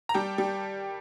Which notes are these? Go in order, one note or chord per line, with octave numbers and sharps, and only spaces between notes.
A#5
G3 G5 A5
G3